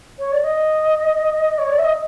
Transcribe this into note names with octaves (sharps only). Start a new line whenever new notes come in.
C#5
D5
D#5
C#5
D5
E5
D#5